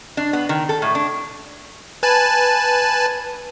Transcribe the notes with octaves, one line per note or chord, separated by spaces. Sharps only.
D4
B3
D#3
A4
A2
D4
B4 G#5 A5